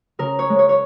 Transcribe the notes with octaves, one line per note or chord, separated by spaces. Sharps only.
C#3 A#4
C#5
G#3
C#5
C#5